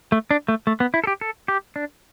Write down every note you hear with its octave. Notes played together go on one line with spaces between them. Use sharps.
A3
D4
A3
A3
B3
E4
A4
G4
A4
G4
D4